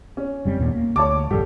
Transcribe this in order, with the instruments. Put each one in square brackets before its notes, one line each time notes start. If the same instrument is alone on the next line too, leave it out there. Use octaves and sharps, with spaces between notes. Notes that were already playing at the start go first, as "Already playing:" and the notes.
[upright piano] C#4
[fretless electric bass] F#1 G3 C4
D#2 A#2 B3
A#3
[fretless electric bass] D2 [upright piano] C#5 A5 D6
[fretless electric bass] F1 A#1 G2 [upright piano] G4 A4